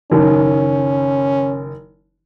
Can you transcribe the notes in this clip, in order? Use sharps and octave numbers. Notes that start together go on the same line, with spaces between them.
F#1 D#3 C#4